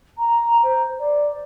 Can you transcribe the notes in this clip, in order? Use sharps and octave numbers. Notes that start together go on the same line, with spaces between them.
A#5
C5
D5